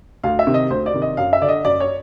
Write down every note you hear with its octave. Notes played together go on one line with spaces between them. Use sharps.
D2 F5
E5
C3 D#3
D#5
D2 C5
D5
C3 D#3
D#5
F#2 F5
E5
D3 D5
D#5
F#2 D5
C#5